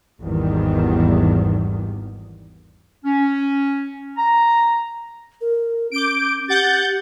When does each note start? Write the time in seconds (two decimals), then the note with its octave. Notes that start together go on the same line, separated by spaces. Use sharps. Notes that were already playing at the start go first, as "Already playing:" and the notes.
0.19 G#1 E2 G#2 D#3 G3
3.05 C#4
4.17 A#5
5.41 A#4
5.91 C#4 D6 G6 D7
6.48 G4 F#5 G6 A6